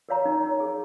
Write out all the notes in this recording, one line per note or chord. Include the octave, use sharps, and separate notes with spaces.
A#4 C#5 F5 A#5
D#4
A#4 C#5 F5 A#5
G#4